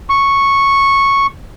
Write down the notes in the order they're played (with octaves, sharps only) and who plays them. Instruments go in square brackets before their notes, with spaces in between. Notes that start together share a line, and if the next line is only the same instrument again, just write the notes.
[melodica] C#6